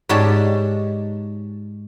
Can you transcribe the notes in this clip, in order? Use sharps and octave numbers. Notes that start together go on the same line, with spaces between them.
G#2 D#4 G4 C#5 D5 A5